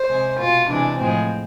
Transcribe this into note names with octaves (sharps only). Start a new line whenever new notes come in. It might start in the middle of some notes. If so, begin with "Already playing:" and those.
Already playing: C5
C3 G#3
B2 G#3 F4
C3 E3 G#3 D4
A2 F3 G#3 C4